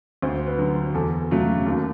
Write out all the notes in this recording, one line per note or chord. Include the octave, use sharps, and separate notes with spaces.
D2 C5
B4
D3 F#3
E2 A4
C#3 F#3 A3
D#2